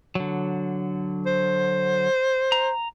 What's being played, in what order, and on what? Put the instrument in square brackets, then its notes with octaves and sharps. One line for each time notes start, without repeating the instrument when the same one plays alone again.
[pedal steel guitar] D3 F#3
[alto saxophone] C5
[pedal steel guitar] A#5